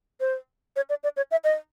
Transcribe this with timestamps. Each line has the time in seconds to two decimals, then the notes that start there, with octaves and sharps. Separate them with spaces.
0.20 C5
0.76 C#5
0.90 D5
1.03 D5
1.17 C#5
1.31 E5
1.44 D#5